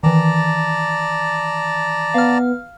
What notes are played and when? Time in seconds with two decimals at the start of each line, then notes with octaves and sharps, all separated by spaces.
0.03 D#3 E3 D5 A5 A#5
2.14 B3 F5 F6